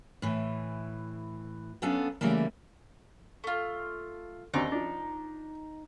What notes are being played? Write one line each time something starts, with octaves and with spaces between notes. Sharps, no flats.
A2 E3
F#3 B3 C#4 D4 A4 F5
C#3 E3 G3 A3 A#3
A3 F4
D#2 C4 D4 D#4
F3 D4